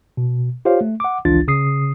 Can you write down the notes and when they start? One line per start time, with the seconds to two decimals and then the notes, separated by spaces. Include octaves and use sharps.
0.17 B2
0.65 F4 G4 C5 C#5 F5
0.81 A3
1.00 F#5 D6
1.25 G#1 C#2 E3 D4 F4 A6
1.48 C#3 D#6 C7